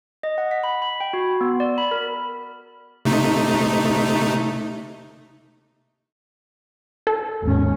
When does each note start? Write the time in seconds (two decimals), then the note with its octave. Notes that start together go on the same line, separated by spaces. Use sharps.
0.23 D#5
0.38 F#5
0.51 B6
0.64 B5
0.82 B5
1.00 G5
1.13 F#4
1.41 B3
1.60 D5
1.78 B5
1.91 A#4
3.05 C3 A3 D#4
7.07 A4
7.43 G#1 D#2 C#4